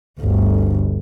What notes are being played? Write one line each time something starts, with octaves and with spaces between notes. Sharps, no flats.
G1 D2